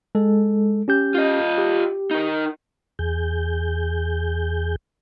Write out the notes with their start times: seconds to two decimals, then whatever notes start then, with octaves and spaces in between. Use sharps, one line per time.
0.15 G#3 A4
0.88 C#4 G4 G6
1.15 F4 D#5
1.58 G4
2.11 D#4 A#4
2.99 E2 G#4 G6